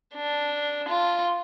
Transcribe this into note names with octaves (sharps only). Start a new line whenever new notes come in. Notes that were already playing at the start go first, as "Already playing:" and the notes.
D4
F4